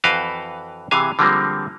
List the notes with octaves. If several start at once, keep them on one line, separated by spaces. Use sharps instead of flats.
F2 E3 F#4 B4 F5 G5
C3 E3 G#4 F5 G#5
D3 F3 G3 G#3 A#3 C4